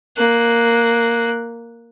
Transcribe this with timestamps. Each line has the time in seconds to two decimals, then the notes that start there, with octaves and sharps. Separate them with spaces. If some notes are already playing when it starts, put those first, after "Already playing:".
0.17 A#3 F#6